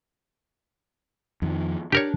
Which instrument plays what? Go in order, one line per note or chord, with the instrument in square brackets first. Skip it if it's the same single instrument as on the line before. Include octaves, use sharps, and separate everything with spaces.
[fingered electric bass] F2 D#3 F3
[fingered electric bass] D4 [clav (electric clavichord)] G4 A#4 C#5